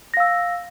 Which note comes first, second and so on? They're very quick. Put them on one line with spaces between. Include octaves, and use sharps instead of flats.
A#6 F5 E6